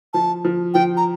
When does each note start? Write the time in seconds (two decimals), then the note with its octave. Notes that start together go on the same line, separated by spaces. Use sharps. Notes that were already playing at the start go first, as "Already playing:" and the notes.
0.13 F3 A5
0.45 F3
0.74 F3 G5
0.97 A#5